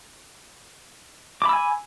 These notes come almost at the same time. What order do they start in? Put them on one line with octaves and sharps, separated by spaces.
D6 B5 E6 G#5